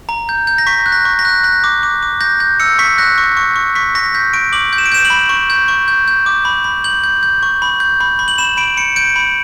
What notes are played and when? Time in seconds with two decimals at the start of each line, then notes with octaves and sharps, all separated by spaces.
0.09 A#5
0.29 G6
0.47 G6
0.58 A#6
0.67 C#6 B6
0.86 F#6
0.92 A#6
1.05 C#6
1.19 A#6
1.25 F#6
1.44 F#6 A#6
1.64 D6
1.83 D6
2.02 D6
2.21 G6 A#6
2.40 G6
2.60 E6 C#7
2.79 C#6 B6
2.98 F#6 A#6
3.18 C#6
3.37 C#6
3.56 C#6
3.75 C#6 B6
3.95 C#6 A#6
4.14 G6 B6
4.33 C#6 D7
4.52 D6 F#7
4.73 G6
4.78 E7
4.86 D7
4.92 G6 E7
5.05 F#7
5.10 B5
5.29 C#6
5.50 G6
5.68 C#6
5.88 G6
6.08 G6
6.26 D6
6.45 B5
6.64 B5
6.84 G6 F#7
7.04 G6
7.23 G6
7.43 C#6
7.62 B5
7.80 G6
8.00 B5
8.19 B5
8.28 F#7
8.38 B5 E7
8.57 B5 D7
8.77 B5 C#7
8.96 G6 D7
9.16 B5